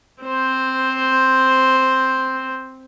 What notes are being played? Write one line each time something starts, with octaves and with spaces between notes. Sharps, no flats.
C4 C5